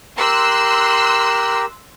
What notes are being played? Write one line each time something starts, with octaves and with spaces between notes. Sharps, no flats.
G4 A#4 C6 E6 F#6